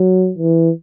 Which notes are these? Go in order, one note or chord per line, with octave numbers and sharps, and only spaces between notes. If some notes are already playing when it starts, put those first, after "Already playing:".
Already playing: F#3
E3